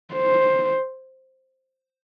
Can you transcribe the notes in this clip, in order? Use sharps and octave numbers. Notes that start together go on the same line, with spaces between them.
C5